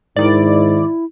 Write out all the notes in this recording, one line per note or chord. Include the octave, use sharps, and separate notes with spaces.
G#2 D#3 E4 D5